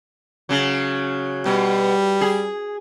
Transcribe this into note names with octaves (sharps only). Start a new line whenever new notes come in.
C#3 F#3
B2 G3
G#4